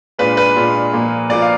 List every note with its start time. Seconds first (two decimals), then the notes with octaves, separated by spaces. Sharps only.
0.19 A#2 G#3 D4 F4 B4
0.37 B4
0.56 A#2 G#3 D4 F4
0.93 A#2 F3 A#3
1.29 A#2 F3 A#3 D5
1.42 F5